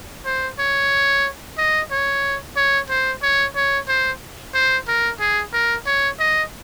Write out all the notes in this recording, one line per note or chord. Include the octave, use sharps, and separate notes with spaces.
C5
C#5
D#5
C#5
C#5
C5
C#5
C#5
C5
C5
A#4
G#4
A#4
C#5
D#5